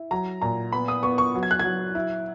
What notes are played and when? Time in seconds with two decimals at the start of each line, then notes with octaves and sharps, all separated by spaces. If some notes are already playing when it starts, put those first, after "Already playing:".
Already playing: E4
0.11 F#3 A#5
0.42 A#2 A#5
0.73 B3 B5
0.88 D#6
1.03 B3 C#6
1.18 C#6
1.35 F#3
1.43 G#6
1.51 F#6
1.59 F#3 G#6
1.95 E4